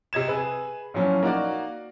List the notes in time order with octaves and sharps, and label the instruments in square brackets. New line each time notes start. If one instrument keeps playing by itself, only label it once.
[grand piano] C3 D#5 G#6 E7
G#4 B4
A#2 F3 F#3 C#4 E4
A#3 D#4 F#4 D5